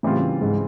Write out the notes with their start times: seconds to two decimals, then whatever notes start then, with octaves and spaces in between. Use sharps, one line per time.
0.03 A2 C#3 E3 G3 C4 F4
0.41 G#2